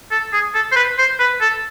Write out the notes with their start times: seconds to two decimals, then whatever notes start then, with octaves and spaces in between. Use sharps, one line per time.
0.11 A4
0.33 G#4
0.54 A4
0.72 C5
0.76 B4
0.98 C5
1.19 B4
1.41 A4